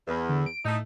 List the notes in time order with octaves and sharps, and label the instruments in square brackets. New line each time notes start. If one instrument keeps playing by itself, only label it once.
[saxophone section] E2
[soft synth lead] D3
D7
[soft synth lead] A2 [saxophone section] A3 D#4